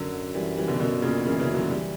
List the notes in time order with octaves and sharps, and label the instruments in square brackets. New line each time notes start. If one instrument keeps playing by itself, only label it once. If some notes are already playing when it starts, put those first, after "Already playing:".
Already playing: [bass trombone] F#2 [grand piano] D3 F#3
[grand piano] E3 G3
E3 G3
B2 D3
[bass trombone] F#2 [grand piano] B2 D3
[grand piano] A#2 C#3
[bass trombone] F#2 [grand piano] C#3 E3
[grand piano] C#3 E3
D3 F#3
E3 G3